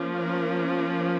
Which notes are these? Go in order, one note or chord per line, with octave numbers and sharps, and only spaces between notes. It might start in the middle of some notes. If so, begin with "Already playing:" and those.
Already playing: F3 A#3 C#4
A#4